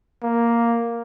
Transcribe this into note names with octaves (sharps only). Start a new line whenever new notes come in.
A#3